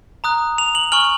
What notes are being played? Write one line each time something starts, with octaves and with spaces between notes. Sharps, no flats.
A#5 D#6 F#6
F7
F#7
G#5 C#6 F6 F#7